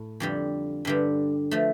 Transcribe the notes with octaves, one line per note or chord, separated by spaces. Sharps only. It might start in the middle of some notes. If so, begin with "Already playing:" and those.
Already playing: A2
F2 D3 G3
G2 D3 G3
F3 A3